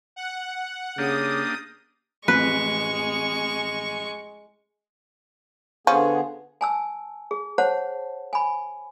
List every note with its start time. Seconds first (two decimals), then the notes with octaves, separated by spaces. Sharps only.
0.16 F#5
0.98 C#3 A#3 D4 G4 D#6
2.28 A1 F2 G#3 B4 C#6
5.87 D3 F3 B3 C#4 G#4
6.61 G#5 A5 E6
7.31 G#4
7.58 C5 C#5 F#5 A5
8.33 G#5 B5